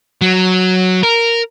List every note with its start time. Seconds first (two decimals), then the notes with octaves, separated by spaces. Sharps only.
0.21 F#3
1.03 A#4